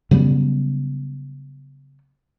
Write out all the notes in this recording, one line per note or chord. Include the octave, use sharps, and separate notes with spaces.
C#3 F#3 G3 B3